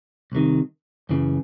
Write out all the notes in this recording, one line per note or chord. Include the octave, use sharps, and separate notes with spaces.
C2 C3 D#3
F#2 C#3 E3